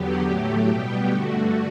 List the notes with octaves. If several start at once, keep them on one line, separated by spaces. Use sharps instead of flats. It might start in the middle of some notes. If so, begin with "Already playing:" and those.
Already playing: E2 D3 F#3 B3 G4
A2 F#3 A3
B2 G3 B3
G2 D3 A3 F#4